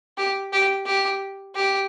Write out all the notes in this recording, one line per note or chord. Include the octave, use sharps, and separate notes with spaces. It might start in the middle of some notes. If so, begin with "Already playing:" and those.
G4
G4
G4
G4